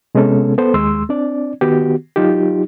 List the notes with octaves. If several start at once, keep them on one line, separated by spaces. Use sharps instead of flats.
C3 G#3 B3 C#4 A4
B3 A4 C5
D#2 G#3 C6 E6
C4 D4 D5
D#3 B3 F#4 G4
F#3 D#4 F4 G4